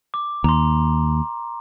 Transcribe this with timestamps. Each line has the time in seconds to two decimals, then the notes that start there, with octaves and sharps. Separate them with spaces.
0.14 D6
0.44 D#2 A#5 C6